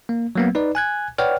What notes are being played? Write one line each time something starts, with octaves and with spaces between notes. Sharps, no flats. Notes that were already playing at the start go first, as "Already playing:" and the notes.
A#3
F#3 A#3 B3
D#4 B4 D5
G#5 F#6 G#6
B4 C#5 D5 F#5 G5 F6